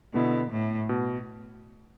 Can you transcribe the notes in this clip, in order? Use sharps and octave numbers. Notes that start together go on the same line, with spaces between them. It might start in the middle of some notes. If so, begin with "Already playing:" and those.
B2 D3 B3 E4
A2
B2